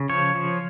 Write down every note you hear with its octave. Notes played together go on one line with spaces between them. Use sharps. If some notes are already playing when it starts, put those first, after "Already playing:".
Already playing: C#3
F3 C#5
F3